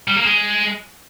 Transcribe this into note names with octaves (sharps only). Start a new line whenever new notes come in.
G3
A#3
G#3